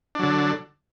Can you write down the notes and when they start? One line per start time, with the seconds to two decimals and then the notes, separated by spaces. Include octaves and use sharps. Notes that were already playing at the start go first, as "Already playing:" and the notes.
0.15 D4
0.19 F#3
0.23 D3